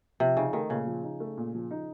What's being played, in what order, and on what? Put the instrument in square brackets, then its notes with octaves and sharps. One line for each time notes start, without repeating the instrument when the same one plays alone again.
[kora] C3 [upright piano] F3
[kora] C#3 [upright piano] D#4
[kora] D#3 [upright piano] A3
[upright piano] A#2 [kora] C#3
[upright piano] F3
D#4
A3
A#2
F3
D#4